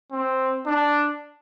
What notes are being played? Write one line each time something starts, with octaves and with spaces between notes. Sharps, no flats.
C4
D4